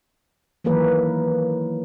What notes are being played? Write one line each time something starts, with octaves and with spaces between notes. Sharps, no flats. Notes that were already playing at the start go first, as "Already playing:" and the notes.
D#3 E3 F#3 A#3 A#4 B4